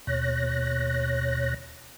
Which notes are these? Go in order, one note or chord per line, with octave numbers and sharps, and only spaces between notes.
D#2 B2 C#5 F#6 A#6